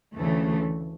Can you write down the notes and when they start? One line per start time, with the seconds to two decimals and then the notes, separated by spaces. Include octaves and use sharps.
0.15 D2 C#3 E3 A3